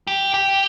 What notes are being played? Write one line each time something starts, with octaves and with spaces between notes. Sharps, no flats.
G4
G4